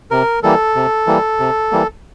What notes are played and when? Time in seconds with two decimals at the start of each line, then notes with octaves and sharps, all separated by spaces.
0.11 C3 A#4
0.43 E3 G3 A#3 A4
0.75 C3
1.07 E3 G3 A#3
1.39 C3
1.71 E3 G3 A#3